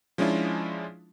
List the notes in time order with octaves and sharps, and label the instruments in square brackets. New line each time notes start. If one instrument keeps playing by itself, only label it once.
[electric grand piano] F3 G#3 C#4 D4 E4 F4